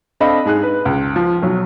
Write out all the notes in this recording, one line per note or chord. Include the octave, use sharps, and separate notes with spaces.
C4 D4 A4 D#5 F5 B5
G#2 G#4 F#6
B4
C#2
F3
B1 F#3